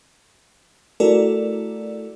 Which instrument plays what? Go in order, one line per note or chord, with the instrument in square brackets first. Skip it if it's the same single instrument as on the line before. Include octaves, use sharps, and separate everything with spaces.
[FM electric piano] A3 E4 F#4 A4 A#4 D5